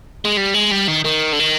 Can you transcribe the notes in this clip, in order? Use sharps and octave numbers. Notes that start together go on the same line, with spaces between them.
G#3
G3
G#3
G3
D#3
D#3
D3
D#3